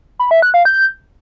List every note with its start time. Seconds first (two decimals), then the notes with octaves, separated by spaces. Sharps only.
0.19 B5
0.31 E5
0.42 F#6
0.54 F5
0.65 G6